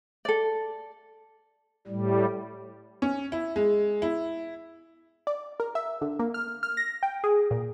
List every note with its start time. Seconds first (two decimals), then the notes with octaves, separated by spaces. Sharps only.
0.25 A4 D5
1.88 A2 G3
3.02 C#4
3.32 E4
3.56 G#3
4.02 E4
5.27 D5
5.60 A#4
5.75 E5
6.01 D3
6.19 A#3
6.34 F6
6.63 F6
6.77 A#6
7.03 G5
7.24 G#4
7.51 A#2